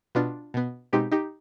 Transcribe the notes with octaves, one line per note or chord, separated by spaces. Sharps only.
B2 B3 D4 F4
B2 B3
B2 G#3 C4 D#4 G4
D#4 G4